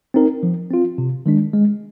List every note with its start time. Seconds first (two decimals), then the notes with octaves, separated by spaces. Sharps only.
0.14 C4 D#4 A#4
0.43 F3
0.70 C4 F4
0.98 C3
1.26 D#3 G#3 D4
1.54 G#3